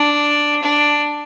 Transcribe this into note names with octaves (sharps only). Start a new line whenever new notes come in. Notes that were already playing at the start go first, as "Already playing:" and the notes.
Already playing: D4
D4